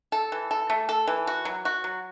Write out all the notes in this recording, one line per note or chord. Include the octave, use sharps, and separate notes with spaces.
A4
E3
A4
A3
A4
E3
F#4
F#3
F#4
F#3